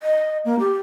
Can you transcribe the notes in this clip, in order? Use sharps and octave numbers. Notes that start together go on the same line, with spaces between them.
D#5
A#3
G4